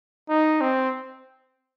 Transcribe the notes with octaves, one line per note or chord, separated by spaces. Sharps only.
D#4
C4